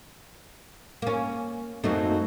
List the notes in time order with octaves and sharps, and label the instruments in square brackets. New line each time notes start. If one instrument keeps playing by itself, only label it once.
[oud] A#3 C#4
[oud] F#2 F#3 A3 [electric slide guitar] A#3 C4 D#4